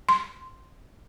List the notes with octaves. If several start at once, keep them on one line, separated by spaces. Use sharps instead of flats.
C6